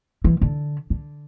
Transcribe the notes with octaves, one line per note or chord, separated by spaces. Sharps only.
E3
D3
D3